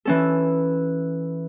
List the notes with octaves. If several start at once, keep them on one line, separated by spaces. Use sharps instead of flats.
E3 C#4 A4